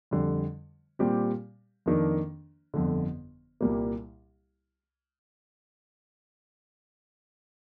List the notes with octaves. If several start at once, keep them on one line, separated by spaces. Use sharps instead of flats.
F2 D3 G3
A#2 G3 C4 G4
F2 D#3 A#3 D4
G1 F2 D3
C2 A#2 G3 A#3